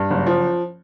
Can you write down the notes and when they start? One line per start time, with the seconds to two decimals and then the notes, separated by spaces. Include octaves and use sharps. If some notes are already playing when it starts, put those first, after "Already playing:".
Already playing: G2
0.10 F#1
0.27 F3